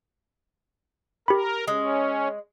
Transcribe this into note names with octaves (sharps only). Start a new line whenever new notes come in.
G4 A#4 B5
G#3 C#4